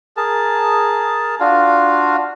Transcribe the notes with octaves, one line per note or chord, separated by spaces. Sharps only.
G#4 A#4 A5
D4 F4 F#4 F5